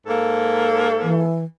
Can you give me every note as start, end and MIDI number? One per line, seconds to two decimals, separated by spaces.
0.07 1.24 44
0.07 1.24 58
0.07 1.24 69
1.02 1.44 52